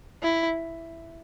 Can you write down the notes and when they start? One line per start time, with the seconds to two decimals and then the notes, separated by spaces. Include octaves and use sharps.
0.23 E4